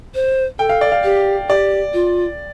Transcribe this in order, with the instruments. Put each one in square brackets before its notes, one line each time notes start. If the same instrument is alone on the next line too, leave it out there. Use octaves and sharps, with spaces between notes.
[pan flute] C5
[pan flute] A4 [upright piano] G5
[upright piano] F5
D5
F5
[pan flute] G4
[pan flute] G4 [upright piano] D5
[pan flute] F4